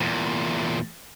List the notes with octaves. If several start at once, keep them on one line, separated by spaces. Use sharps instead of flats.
E2 A#2